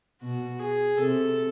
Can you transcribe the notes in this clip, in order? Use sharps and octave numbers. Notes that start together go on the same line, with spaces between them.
B2 F#4
G#4
C3 A4